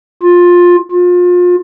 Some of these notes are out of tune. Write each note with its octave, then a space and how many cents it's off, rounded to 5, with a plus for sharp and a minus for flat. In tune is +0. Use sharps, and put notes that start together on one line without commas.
F4 +15
F4 +30